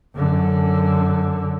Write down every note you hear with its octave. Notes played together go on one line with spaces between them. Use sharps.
F#2 D3